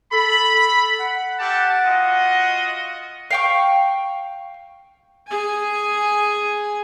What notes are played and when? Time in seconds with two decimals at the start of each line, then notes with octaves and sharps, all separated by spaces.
0.13 A4 B5
0.54 A4
1.00 F#5
1.39 G4 E5 A5
1.85 F4 F#4 D#5
3.30 F5 G5 C#6
5.28 G#4 G#5